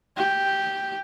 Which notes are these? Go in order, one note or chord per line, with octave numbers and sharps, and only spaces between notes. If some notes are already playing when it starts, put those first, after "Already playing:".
G4